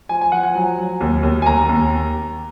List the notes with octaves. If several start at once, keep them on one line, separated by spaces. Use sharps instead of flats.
F3 G#5
G#5
F3 F#5
G#5
F#3
F#3
D#2
D#2
G#5
D#2 A#5
D#2